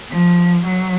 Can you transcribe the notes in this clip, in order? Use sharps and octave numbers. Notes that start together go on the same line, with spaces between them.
F3
F#3